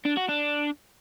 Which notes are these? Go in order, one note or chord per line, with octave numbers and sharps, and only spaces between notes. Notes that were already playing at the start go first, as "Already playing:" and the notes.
D4
F#4
D4